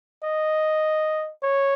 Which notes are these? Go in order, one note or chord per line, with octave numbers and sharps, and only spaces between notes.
D#5
C#5